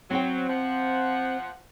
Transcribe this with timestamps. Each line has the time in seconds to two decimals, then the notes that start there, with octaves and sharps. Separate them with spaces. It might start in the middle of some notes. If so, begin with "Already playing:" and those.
0.10 F#3 C4 C5 G5
0.49 F3 F#5